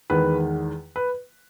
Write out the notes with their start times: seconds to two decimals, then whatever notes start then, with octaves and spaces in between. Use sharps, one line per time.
0.10 E2 D#3 G#3 B4
0.96 B4